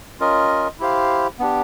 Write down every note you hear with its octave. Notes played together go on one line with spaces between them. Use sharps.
C#4 F4 A#4 D#5
E4 G4 C5 F5
B3 D4 G4